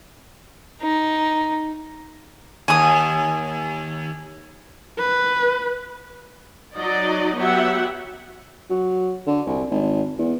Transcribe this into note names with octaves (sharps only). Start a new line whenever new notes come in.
D#4
D#2 G#5 D#6
B4
F#3 D#4 D5 D#5
F#3 B3 G4 E5 F#5
F#3
D3
C2
G#1
E2